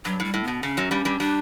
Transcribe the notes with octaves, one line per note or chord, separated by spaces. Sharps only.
G2 F#3
A2 G3
A2
B2 B3
C#3 C#4
F#2 F#3
G2 G3
G2 G3
G3 D4